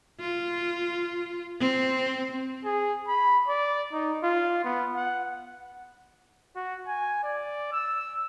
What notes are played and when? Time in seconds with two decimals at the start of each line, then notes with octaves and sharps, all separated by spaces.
0.20 F4
1.60 C4
2.65 G#4
3.08 B5
3.48 D5
3.93 D#4
4.23 F4
4.64 B3
4.96 F#5
6.56 F#4
6.88 G#5
7.24 D5
7.73 E6